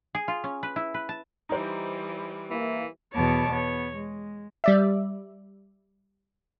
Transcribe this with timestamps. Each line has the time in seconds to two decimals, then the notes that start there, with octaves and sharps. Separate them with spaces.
0.15 G#4
0.28 F4
0.44 C#4
0.63 B4
0.76 E4
0.94 B4
1.09 A5
1.49 E3 G3 D#4 C5
2.51 E3 A#3 E4
3.14 E2 B2 B3 C#5 A5 D6
3.49 E2 B3 C#5
3.95 G#3
4.64 G3 D5 E5